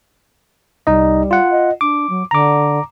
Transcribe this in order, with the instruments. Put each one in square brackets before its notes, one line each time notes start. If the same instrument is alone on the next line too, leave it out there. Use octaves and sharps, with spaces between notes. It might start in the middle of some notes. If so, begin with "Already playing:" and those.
[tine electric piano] C2 D#4 D#5 [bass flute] G3
[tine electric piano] F4 F#5
[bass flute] D#5
[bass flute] D4 [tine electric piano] D6
[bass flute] F#3
[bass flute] D3 [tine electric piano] A#5 D6